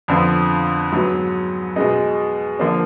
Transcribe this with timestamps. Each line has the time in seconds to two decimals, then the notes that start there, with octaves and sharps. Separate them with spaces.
0.08 F2 D3 F3 B3
0.92 G#2 F#3 B3
1.76 B2 G#3 D#4
2.59 D3 F3 A#3 D4